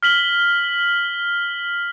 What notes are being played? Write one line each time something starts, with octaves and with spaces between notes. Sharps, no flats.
F6 B6 F#7 G7